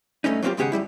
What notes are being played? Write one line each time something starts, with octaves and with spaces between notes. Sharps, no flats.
G2 A3 C#4 D#4
F#3 A#3 C4 C#4 F4 G4
D#2 G#2 C#3 G4 G#4 F#5
F#2 E3 G3 E4